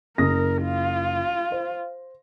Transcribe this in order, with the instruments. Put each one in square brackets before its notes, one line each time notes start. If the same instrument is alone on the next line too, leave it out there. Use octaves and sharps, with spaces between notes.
[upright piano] F#1 D#6 A#6 [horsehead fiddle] A#4
[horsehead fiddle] F4
[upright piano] C5